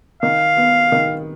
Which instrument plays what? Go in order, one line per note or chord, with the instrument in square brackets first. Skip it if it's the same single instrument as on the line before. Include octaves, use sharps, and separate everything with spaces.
[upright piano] D#3 [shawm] F5
[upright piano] B3
D#3